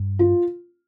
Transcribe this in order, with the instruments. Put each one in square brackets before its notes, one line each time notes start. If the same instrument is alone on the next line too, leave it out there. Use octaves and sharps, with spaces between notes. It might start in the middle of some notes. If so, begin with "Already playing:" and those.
Already playing: [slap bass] G2
[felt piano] F4